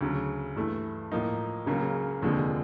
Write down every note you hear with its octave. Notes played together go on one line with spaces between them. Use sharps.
D2 C#3 F#3
G2 E3 A3
A2 F3 A#3 D#4
C#2 C#3 F#3 A#3
F1 D#2 D3 F3 G#3